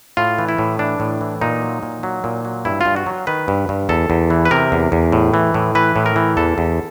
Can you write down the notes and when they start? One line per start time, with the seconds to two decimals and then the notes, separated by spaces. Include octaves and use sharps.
0.17 A2 F4
0.39 E3
0.49 E4
0.58 A2
0.79 E3 D4
1.00 A2
1.21 E3
1.41 A#2 D#4
1.62 F#3
1.83 A#2
2.03 F#3
2.24 A#2
2.45 F#3
2.65 G2 E4
2.81 G2 F4
2.96 F#4
3.06 F#3
3.27 D#3 B4
3.48 G2
3.69 G2
3.89 E2 A4
4.10 E2
4.30 E3
4.45 B4
4.51 C3 A#4
4.72 E2
4.92 E2
5.12 A2
5.34 E3
5.54 A2
5.75 E3 B4
5.96 A2
6.06 A#4
6.16 E3
6.37 E2 A4
6.58 E2